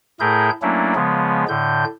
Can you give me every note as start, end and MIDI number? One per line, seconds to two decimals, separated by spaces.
0.20 0.50 45
0.20 0.50 57
0.20 0.50 64
0.20 0.50 68
0.20 0.50 70
0.20 0.50 91
0.62 0.94 54
0.62 0.94 57
0.62 0.94 58
0.62 0.94 61
0.62 0.94 62
0.62 0.94 64
0.95 1.45 49
0.95 1.45 53
0.95 1.45 56
0.95 1.45 59
1.49 1.85 45
1.49 1.85 50
1.49 1.85 91